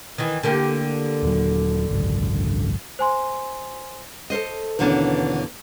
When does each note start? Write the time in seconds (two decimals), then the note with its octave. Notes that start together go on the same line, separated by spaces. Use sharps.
0.18 D#3 E3
0.43 D3 A#3 G4
1.23 D#1 F#3
1.91 G#1 C#2 F#2
2.99 C5 G#5 C6
4.30 A4 A#4 C5 D#5
4.79 D#2 B2 D3 E3 C#4 D4